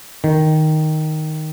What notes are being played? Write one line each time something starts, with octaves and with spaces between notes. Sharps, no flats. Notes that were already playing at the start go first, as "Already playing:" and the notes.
D#3